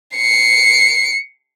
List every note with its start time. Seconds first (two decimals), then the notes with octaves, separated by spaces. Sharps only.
0.16 C7 C#7